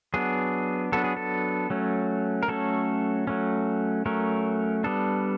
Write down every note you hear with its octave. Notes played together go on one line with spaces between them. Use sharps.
F#3 B3 D4 G#4
F#3 B3 D4 A4
G#4
A4
F#3 A3 C#4
A#4
F#3 A3 C#4 A4
F#3 A3 C#4
F#3 A3 C#4 A#4
G3 B3 D4 A4